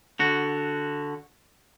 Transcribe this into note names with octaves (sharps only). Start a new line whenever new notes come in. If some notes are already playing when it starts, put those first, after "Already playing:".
D3 F#4